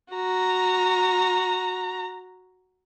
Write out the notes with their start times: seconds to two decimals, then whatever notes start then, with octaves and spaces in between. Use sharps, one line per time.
0.13 F#4 A#5